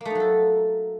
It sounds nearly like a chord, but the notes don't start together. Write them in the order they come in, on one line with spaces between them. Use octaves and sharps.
A#3 A3 D#4 F#3 A4